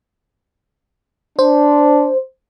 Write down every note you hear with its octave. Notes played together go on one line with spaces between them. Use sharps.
D4 C5